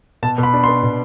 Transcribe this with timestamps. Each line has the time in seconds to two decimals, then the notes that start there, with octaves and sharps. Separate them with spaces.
0.23 B2 A5
0.38 B2
0.43 B5
0.54 D4
0.64 B3 C6
0.83 B2